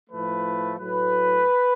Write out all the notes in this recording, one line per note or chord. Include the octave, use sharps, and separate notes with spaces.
A2 F3 A3 B4
A2 F#3 A3 B4